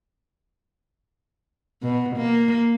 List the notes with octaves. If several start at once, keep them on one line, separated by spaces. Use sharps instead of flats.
B2
A#3